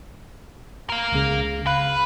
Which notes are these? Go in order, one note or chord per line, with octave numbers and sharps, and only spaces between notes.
A#4 F5
C#2 C#3
B4 F5 F#6